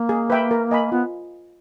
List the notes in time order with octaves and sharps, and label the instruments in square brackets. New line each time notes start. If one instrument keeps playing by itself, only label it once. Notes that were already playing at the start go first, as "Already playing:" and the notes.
Already playing: [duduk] A#3
[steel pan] G#4
B4 E5 G5 B5
A#4
D#5 G#5 B5
[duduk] B3 [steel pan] F4